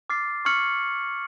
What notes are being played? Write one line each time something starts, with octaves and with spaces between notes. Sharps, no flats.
D6 F6 A6 C7
C#6 F6 G#6 C#7 F#7